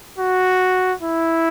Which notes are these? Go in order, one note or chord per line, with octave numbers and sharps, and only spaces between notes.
F#4
E4